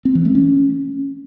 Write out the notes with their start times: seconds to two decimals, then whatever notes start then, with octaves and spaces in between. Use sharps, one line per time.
0.05 C4
0.15 E3
0.25 A3
0.35 C#4